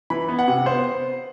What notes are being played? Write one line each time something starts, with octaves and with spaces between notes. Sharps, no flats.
E3 B5
B3
F#5
C3
B3 C5